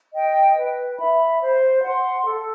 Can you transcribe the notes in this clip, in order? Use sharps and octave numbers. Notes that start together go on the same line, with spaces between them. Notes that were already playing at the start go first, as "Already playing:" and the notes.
D#5 G5
B4
E5 B5
C5
F#5 C6
A4